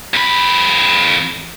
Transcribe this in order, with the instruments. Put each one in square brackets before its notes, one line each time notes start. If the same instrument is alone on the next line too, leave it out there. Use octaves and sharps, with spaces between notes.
[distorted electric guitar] F2 B5